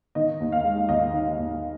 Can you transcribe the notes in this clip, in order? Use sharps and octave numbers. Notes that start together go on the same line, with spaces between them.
D#3 D#5
D#2
F5
G#3
D#2 D#5
D#3
D#2